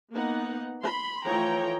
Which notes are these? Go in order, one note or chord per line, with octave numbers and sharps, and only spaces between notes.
A#3 B3 D#4 F#5
B5 C6
E3 F3 A3 C#5 G5 A#5